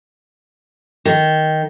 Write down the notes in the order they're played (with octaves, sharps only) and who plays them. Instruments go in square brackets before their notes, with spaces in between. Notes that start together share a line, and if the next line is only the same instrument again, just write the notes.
[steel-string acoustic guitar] D#3